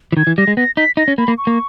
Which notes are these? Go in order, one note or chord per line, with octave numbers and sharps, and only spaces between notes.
E3
D#3 G#6
E3
G3 A#6
G#3
B3 A#6
D#4 B6
D#4 A#6
C#4
A#3 B5
A#3
C#6
A#3